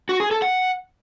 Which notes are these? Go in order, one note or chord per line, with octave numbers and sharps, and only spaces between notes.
F#4
G#4
A4
F#5